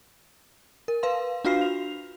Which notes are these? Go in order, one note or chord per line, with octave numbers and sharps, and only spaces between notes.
A#4
B4 F5 C6
D4 F4 F#4 F5 F6 C7
F7